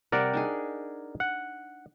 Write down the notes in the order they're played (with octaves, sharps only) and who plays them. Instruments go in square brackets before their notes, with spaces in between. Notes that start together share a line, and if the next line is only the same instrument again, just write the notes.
[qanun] C3 G3 [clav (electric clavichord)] A#4 D5 F#5
[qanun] D4 D#4 G#4
[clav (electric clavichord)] F#5